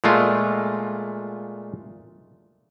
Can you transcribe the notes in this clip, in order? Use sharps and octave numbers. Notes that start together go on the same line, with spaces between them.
A#2 G#3 A3 F4